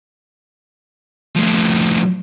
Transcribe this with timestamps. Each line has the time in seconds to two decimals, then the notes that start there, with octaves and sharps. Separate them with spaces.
1.36 A2 F3